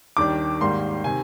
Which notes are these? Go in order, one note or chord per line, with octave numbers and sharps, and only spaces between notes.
D#2 D#3 G3 D4 D6
G#2 D#3 G3 A#3 C6
C3 D#3 G#5